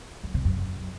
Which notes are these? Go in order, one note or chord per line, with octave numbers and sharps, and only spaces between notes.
F#2
C3
F#2